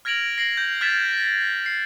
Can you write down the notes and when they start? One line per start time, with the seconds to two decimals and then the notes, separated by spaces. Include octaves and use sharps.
0.05 F6 G#6 A#6 D7 F7 F#7
0.38 A#6 C7 F#7
0.57 G6
0.81 F6 G#6 A6 B6 E7
1.12 B6
1.66 C7